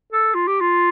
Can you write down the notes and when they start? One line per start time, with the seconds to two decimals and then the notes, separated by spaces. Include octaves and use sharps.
0.12 A4
0.34 F4
0.47 G4
0.61 F4